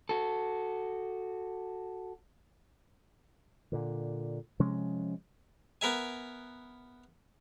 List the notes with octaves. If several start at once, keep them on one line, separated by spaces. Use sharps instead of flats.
F#4 A4
A#2 D3
C3 F3 G#3 C#4
B3 A#4 E5 G#5